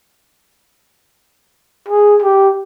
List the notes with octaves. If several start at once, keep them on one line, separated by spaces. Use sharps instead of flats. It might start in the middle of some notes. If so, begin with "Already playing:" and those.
G#4
G4